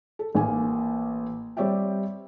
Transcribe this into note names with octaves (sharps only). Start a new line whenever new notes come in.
A4
A1 A#3 G#5
G3 C4 C#5 D5 E5 G5